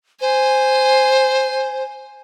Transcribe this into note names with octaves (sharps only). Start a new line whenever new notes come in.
C5 G#5